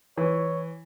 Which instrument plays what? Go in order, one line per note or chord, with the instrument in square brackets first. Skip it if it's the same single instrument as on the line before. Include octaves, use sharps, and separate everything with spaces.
[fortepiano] E3 [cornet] C#5